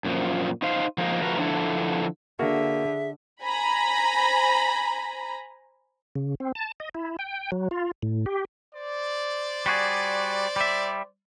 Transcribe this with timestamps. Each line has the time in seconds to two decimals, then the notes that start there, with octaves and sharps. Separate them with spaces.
0.05 F#2 A#2 F3
0.62 D#4 C5 F5
0.98 F3 G#3 A#3 D#4 A#4
1.22 F3 A3 F#4 A#4 B4 A#5
1.37 D3 F3 D4 E4 A4
2.39 D3 A#3 F#4 G#4 E5
3.42 C5 G#5 A#5 B5
6.16 C#3
6.40 C4
6.55 A5
6.80 D#5
6.95 E4
7.19 G5
7.52 F#3
7.71 F4
8.02 A2
8.26 G4
8.73 C5 D5
9.66 G3 F#4 G#4
10.56 G3 E5